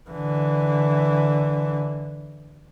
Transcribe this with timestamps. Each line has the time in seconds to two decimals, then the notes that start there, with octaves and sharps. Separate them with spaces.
0.10 D3 E3